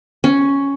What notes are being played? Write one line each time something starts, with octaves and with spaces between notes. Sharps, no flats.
C#4